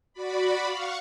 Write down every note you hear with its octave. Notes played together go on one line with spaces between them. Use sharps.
F#4 D5 B5
F5 F#5 C#6